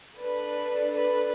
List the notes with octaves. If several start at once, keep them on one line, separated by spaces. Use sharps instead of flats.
D4 A4 B4
B4